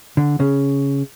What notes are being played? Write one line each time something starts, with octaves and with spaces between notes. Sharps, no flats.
D3
C#3